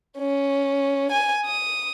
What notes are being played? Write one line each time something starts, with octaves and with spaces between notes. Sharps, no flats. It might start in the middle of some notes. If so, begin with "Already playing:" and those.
C#4
G#5
D#6